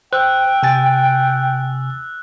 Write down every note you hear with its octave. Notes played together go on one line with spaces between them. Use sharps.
C5 G5 E6 F#6
C3 G#5 A6